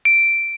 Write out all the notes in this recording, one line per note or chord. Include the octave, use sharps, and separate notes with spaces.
D7